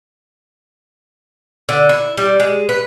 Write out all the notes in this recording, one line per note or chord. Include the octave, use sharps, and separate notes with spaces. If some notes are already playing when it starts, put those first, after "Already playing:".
D3
E4
G3
G#3
B4